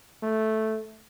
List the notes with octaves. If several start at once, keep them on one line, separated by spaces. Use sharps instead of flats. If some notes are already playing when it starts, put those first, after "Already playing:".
A3